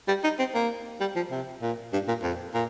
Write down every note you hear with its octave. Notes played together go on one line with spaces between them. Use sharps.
G3
D#4
C4
A#3
G3
F3
C3
A#2
G2
A#2
F2
A#2